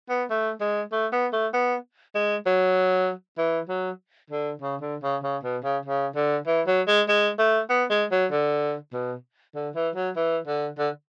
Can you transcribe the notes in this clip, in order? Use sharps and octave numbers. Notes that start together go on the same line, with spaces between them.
B3
A3
G#3
A3
B3
A3
B3
G#3
F#3
E3
F#3
D3
C#3
D3
C#3
C#3
B2
C#3
C#3
D3
E3
F#3
G#3
G#3
A3
B3
G#3
F#3
D3
B2
D3
E3
F#3
E3
D3
D3